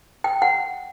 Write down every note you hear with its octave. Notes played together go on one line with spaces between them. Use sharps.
G5
F#5